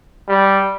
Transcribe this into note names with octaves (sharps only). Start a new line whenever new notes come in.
G3